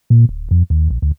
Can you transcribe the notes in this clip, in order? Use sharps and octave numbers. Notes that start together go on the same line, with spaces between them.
A#2
D1
F2
D#2
A#1
D2